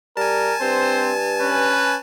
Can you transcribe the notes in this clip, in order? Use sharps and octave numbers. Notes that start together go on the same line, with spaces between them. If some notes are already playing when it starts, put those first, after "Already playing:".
G3 A#4 G#5 A5
G2 C4 C5
C#4 B4